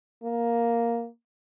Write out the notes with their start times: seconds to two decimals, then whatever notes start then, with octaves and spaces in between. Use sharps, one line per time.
0.23 A#3